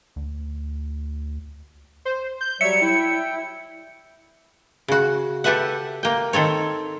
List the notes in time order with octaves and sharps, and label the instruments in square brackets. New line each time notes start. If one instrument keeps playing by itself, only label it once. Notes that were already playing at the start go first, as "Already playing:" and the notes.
[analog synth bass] D2
[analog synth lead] C5
G6
[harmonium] F#3 G3 C#5 [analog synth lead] E5 [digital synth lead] C#7
[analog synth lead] E4 [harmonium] G5
[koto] C#3 F#4
G4 A4 B4 E5 F#5
A#3 G5
D#3 C4 A4 C#5